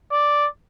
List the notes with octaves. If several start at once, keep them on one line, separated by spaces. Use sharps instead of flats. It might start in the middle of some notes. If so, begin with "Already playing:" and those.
D5